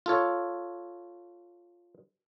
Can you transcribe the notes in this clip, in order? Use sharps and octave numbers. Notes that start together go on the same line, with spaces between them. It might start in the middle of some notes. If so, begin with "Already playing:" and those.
F4 A4 C#5